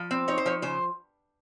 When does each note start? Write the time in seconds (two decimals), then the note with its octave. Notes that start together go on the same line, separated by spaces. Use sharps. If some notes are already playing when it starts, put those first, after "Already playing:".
Already playing: F3
0.11 C4
0.28 D#4 C#5
0.38 C5
0.46 F3 C#5
0.62 C#3 C5